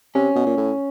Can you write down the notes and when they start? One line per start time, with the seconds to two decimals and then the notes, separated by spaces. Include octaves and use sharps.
0.15 C3 C#4
0.36 B2
0.46 A#2
0.57 A2